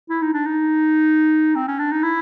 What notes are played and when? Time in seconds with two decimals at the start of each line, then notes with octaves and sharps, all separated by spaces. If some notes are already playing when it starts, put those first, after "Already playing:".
0.09 E4
0.22 D#4
0.33 D4
0.46 D#4
1.55 C4
1.68 C#4
1.79 D4
1.92 D#4
2.03 E4